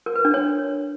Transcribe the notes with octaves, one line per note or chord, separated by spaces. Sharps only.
A#4
B4
D4
C#5